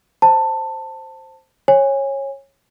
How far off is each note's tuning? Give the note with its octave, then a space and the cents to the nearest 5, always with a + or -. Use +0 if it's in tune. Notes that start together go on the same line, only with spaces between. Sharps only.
C5 +5 A5 +15
C#5 -20 G#5 -20